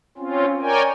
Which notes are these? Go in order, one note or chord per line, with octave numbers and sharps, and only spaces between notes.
C4 C#4 F4
A#4 C#5 D5 G5 G#5